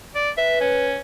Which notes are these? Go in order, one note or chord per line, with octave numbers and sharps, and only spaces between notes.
D5
B4 E5
C#4